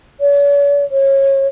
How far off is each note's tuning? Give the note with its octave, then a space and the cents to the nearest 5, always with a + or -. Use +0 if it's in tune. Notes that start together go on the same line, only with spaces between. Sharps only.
C#5 +45
C#5 -25